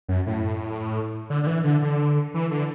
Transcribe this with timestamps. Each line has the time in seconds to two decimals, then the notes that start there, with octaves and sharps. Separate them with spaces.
0.08 F#2
0.27 A2
1.30 D3
1.43 D3
1.47 E3
1.64 D3
1.82 D3
2.34 E3
2.51 D3